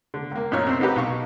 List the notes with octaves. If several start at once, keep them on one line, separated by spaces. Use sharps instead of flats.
D3
C#2 A#3
F#2 A#2 D#4 F4 C#5 F6
C3 C4
B3 D#4 F#4 G4 B4
B1 D#4 F5 C#6